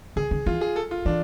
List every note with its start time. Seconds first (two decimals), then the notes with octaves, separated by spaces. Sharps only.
0.16 D3 G#4
0.31 D3
0.46 E3 F4
0.61 G#4
0.76 A4
0.91 F4
1.05 E3 D4